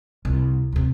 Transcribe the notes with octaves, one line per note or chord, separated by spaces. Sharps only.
C2
D2 C3